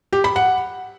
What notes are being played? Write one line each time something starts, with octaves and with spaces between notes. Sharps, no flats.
G4
B5
F#5